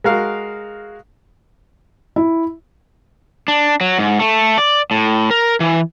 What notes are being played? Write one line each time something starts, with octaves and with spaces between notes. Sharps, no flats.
G#3 F#4 A#4 F5
E4
D4
F#3
G#2
A3
D5
A2
A#4
E3